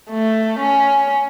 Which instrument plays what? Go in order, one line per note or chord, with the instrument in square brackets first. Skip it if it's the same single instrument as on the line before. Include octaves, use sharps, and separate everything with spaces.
[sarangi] A3
C#4